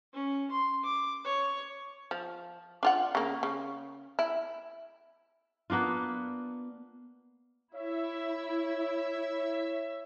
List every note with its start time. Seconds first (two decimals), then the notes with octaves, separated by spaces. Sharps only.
0.13 C#4
0.51 C6
0.84 D6
1.24 C#5
2.11 F3
2.83 D4 F4 F#5
3.15 C#3 A#3
3.43 C#3
4.19 E4
5.70 A#3 B3 D4 F4
7.75 E4 C#5 E5